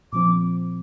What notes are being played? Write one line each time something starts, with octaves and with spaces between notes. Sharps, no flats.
A#2 F3 C4 D6